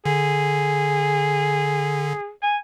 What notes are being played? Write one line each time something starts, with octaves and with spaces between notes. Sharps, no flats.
D3 G#4
G#5